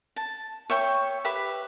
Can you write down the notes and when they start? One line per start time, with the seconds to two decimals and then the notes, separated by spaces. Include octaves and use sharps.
0.16 A5
0.70 C#5 E5 G5 C#6
1.25 G4 B4 E5 B5